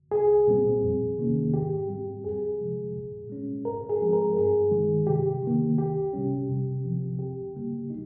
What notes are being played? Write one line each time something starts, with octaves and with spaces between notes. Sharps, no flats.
C2 G#4
A#2 G3 C4
F2
C3 D#3 A#3 C#4
G#2 G4
G3 C4
F2 G#4
C3 F3 G#3
A#2
G#3 C#4
G#2 A#4
G#4
F3 G#3 C4
A#4
G2 G#4
D#3 G#3
C3 G4
D#3 A#3
C2 G4
C3 G3 C#4
C3
F3 C4
C#2 G4
C#3 G3 A#3
D#4